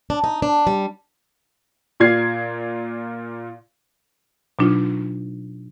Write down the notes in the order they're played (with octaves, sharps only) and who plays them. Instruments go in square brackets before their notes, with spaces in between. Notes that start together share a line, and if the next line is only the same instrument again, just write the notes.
[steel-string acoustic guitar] D4
D#4
D4
G3
[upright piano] A#2 F4 D5 G#6 C7
[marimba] B2 F#3 D4 D#4 F4